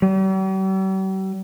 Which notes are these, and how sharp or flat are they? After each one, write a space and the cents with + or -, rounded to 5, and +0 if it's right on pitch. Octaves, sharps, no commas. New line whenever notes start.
G3 -45